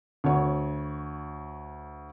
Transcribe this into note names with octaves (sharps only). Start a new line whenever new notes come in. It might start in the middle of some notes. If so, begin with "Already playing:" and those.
D2 C#5